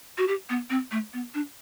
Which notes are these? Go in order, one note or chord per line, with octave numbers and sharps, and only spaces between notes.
F#4
G4
B3
C4
A3
B3
D4